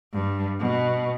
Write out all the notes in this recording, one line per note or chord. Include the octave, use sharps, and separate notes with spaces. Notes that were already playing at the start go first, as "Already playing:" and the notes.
G2
B2